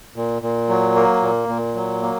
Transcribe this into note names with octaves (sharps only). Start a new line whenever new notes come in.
A#2
A#2
F#3
A#3
A#2
A#2
F#3
A#3